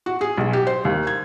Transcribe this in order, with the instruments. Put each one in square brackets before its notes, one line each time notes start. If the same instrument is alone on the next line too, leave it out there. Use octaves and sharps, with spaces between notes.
[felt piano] F#4
G#4
B1
G4
C5
D#2
G#6